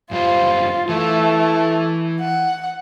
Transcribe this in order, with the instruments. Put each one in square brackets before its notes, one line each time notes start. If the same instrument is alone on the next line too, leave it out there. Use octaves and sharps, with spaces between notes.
[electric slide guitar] F#2 G3 C5 [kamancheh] F4
[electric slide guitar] E3 E4 [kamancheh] A3
[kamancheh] F#5